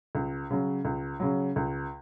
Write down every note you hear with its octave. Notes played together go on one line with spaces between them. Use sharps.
C#2
C#3 F#3
C#2
C#3 F#3
C#2